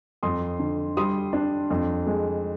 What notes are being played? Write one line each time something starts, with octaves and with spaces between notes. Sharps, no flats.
F2 C6 D#6
D3
G3 C6 D#6
D4
F2
G#3